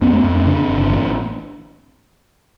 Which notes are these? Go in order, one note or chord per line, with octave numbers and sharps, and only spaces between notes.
F2 B3 C#4
A3 B3
F2
C4 D4
C#3 C4 D4
G1
A1